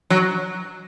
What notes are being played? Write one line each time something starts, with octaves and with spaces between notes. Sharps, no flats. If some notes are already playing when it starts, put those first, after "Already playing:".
F#3